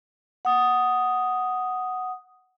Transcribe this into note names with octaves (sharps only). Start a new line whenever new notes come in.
F#5 D#6